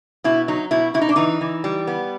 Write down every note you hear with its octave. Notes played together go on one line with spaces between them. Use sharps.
B2 E4
F#3 D#4
B2 E4
B2 E4
D#4
D4
E3 D#4
E3
G3
B3